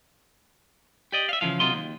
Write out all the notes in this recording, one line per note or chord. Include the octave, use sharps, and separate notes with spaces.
G4 D5 D#5
E5 F5
C#3 E3 F3 F5
C3 F#3 F4 A#4 D#5 C6
D#2